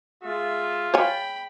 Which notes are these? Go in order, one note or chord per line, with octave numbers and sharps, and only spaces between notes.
G#3 F4 E5
C#5 F5 G5 G#5 B5